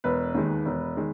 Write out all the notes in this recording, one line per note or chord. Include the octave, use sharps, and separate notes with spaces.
E1 B4
D#2 D#3 G#3
E1
D#3 G#3